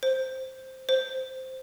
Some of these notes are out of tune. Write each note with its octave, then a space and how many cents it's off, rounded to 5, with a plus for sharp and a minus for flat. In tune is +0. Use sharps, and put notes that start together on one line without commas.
C5 +0
C5 -5